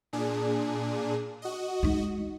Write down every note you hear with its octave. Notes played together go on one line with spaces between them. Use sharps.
A#2 D4 G#4
F#4 D#5
G#3 D#4